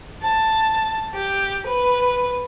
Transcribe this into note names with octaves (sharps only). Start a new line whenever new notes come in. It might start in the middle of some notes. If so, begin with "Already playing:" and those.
A5
G4
B4